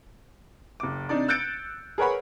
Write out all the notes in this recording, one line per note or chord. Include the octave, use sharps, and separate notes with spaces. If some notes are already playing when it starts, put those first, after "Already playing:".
F#1 D6
C3 D4 D#4 D5
E6 F#6 G6 A6 C#7 D7
G#4 A#4 B4 C#5 F#5 B5